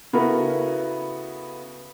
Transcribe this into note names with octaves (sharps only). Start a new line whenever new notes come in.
C#3 B3 E4 F#4 A4 A#4